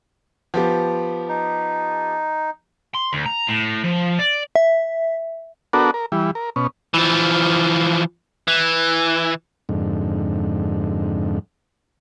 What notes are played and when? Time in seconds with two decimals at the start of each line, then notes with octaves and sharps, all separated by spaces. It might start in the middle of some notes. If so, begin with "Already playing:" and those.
0.54 F3 B3 G4
1.29 D#4
2.94 C6
3.13 D2
3.26 A#5
3.48 A2
3.84 F3
4.19 D5
4.55 E5
5.73 B3 D4 F#4 A4 A#4
5.94 A#4
6.12 E3 G3
6.35 A#4
6.56 B2 C#4
6.94 E3 F3
8.48 E3
9.69 F2 G#2 D3